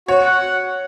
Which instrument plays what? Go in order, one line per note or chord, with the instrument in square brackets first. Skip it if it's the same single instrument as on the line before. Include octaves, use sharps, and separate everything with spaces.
[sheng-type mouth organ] F#4 [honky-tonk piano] C#5
[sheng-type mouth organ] F#5